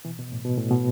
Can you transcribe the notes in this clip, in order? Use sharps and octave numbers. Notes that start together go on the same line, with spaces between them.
B2 E3
B2
A2
B2
A2
B2